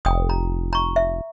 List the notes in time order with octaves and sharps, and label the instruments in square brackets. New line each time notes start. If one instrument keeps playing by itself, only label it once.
[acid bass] F1 [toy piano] G5 D#6
[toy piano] A#5
A#5 C#6
E5